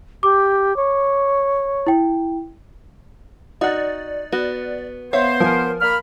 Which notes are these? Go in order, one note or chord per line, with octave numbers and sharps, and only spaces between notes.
G4 D6
C#5
E4 G5
D#4 F#4 D5 F#5
B3 F#4
B3 C5 C#5 E5 F5
F3 A#4 G#5
A#3 B5 F6